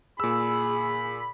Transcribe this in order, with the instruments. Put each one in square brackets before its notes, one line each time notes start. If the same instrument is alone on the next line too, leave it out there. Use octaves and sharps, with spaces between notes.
[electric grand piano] A#2 E6 [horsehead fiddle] G#4 [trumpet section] B5